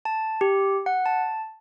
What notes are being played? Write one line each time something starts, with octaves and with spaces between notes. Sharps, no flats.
A5
G4
F#5
A5